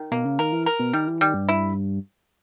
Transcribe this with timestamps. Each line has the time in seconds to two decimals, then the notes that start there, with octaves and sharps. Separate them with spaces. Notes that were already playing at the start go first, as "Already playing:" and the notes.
Already playing: D#3
0.11 B2 A#3
0.25 C#3
0.39 D#3 A#4
0.53 E3
0.66 A#4
0.79 B2
0.93 D#3 G3
1.07 E3
1.21 D#3 G3
1.34 G2
1.49 E4